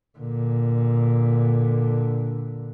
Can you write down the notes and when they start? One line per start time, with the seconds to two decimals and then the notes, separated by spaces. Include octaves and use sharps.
0.18 A#2 D3